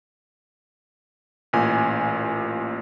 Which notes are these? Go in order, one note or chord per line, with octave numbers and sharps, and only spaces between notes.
A1 A#2 G#5